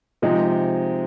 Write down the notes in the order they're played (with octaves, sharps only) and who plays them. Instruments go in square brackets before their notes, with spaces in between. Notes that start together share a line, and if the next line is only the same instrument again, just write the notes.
[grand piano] C3 F3 G#3 D#4